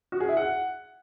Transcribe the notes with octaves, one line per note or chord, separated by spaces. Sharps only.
F#4
G#4
E4
F#5